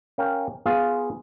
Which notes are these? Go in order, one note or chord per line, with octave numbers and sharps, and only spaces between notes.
C#4 A#4 F5 G5
B3 F4 G#4 F5